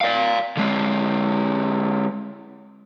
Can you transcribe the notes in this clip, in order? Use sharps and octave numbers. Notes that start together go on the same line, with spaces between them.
D5 F5
D3 G#3